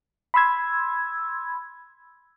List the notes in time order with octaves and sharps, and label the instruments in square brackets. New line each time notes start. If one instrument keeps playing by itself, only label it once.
[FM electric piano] B5 C6 E6 G#6